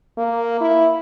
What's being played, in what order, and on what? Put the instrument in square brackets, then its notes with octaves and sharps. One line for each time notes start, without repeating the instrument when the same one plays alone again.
[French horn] A#3
E4